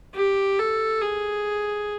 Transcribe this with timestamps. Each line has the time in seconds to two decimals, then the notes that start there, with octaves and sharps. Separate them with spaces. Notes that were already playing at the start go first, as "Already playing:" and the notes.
0.14 G4
0.59 A4
1.01 G#4